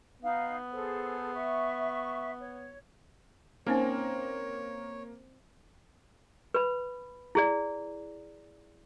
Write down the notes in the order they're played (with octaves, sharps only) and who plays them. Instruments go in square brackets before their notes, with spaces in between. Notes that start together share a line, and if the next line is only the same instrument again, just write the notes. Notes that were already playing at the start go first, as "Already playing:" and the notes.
[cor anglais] B3 [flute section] D#4 F5
[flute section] G#4 A4 C5
E5 C#6
C#5
[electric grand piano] A#3 A#4 [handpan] C4 [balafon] C#4 D#4 F5 [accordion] C#5
[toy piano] B4 B5
E4 G#4 D5